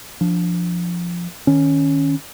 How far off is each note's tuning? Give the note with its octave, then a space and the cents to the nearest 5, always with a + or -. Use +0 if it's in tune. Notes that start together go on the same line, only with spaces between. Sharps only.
F3 +0 D4 +0
D#3 -5 C#4 +0